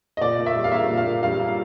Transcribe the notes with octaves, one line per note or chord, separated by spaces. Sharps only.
D#5
A#2 D5
A#2
E5
G3
F5
A#3 E5
A#2
F5
A#2
G3 F5
A#3
F5